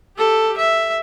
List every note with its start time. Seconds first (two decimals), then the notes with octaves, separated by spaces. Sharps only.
0.17 G4 A4
0.57 E5